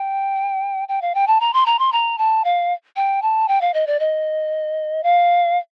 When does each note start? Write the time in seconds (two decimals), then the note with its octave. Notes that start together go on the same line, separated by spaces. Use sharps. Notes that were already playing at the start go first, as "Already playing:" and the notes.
Already playing: G5
0.88 G5
1.02 F5
1.15 G5
1.27 A5
1.40 A#5
1.53 C6
1.66 A#5
1.79 C6
1.92 A#5
2.18 A5
2.44 F5
2.96 G5
3.22 A5
3.48 G5
3.61 F5
3.74 D#5
3.87 D5
4.00 D#5
5.03 F5